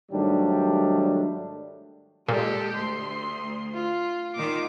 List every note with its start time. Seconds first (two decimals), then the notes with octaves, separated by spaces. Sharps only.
0.11 G#2 D#3 F#3 G3 A3 D4
2.28 A#2 G#3 G4 A4
2.76 D2 C6
3.75 F4
4.35 A#2 D#3 F4 D6